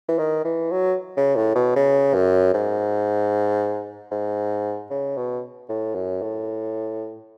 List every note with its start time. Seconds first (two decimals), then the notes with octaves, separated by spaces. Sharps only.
0.09 E3
0.19 D#3
0.45 E3
0.71 F#3
1.17 C#3
1.36 A2
1.55 B2
1.76 C#3
2.15 F#2
2.54 G#2
4.11 G#2
4.91 C#3
5.17 B2
5.69 A2
5.95 F#2
6.22 A2